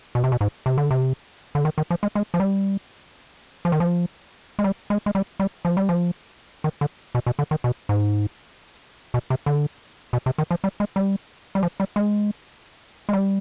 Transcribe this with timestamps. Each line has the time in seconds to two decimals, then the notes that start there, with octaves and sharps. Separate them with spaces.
0.15 B2
0.24 C3
0.32 B2
0.41 G#2
0.66 C3
0.78 D3
0.91 C3
1.55 D3
1.65 D#3
1.78 D#3
1.90 F3
2.03 G#3
2.15 G#3
2.34 F3
2.40 G3
3.65 F3
3.72 D#3
3.80 F3
4.59 G#3
4.64 G3
4.90 G#3
5.06 G#3
5.15 G3
5.40 G3
5.65 F3
5.77 G3
5.89 F3
6.64 D#3
6.81 D3
7.15 B2
7.26 B2
7.39 D3
7.51 D#3
7.64 B2
7.89 G#2
9.14 B2
9.30 C3
9.46 D3
10.13 B2
10.26 C3
10.38 D#3
10.51 F3
10.64 G3
10.80 G#3
10.96 G3
11.55 G3
11.63 F3
11.80 G3
11.96 G#3
13.09 G#3
13.13 G3